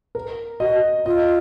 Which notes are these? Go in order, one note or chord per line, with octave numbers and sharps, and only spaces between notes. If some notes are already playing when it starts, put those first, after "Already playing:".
A#4
F#4 D#5
F4 D#5